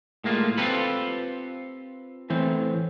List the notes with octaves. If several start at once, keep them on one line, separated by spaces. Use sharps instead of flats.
A2 G#3 A#3 F4
C4 F4 G4 A4 B4
A2 E3 C4